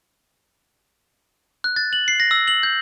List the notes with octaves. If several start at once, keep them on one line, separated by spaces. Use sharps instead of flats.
F#6
A6
F#7
C7
A#6
E6
F#7
G6